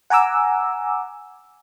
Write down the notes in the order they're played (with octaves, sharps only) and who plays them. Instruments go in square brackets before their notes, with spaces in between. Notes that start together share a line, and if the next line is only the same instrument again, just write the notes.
[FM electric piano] F#5 G#5 A#5 D6 E6